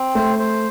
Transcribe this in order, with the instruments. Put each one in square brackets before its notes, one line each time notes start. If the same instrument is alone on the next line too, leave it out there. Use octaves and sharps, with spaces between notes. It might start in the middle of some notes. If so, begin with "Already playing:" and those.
Already playing: [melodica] C4
[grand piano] A3 [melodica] C5
[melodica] C5